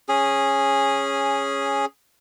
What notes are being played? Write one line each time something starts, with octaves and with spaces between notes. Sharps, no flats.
C#4 G#4